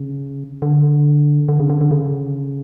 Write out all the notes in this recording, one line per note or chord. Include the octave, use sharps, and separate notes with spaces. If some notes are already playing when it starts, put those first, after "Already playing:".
Already playing: C#3
D3
D3
C#3
D3
D3
C#3